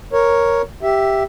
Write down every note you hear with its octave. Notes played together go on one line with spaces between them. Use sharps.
A#4 C#5
G4 E5